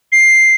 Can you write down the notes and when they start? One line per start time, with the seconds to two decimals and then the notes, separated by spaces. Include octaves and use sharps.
0.12 C7